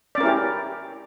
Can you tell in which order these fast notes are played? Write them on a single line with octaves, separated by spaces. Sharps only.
D5 C#4 A#4 E4 G4